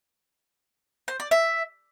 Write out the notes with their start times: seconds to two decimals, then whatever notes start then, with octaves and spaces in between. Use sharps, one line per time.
1.08 C5
1.20 D5
1.31 E5